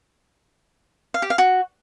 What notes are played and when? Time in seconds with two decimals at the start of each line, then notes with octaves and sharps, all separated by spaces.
1.14 F5
1.22 G4
1.30 F5
1.38 F#4